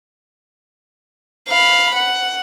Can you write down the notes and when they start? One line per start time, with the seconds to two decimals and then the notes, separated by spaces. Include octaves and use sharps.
1.48 F5 B5
1.95 F#5